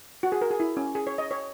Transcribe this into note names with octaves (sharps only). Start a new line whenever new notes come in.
F#4
G#4
A#4
G#4
E4
C#4
G#4
C#5
D#5
C#5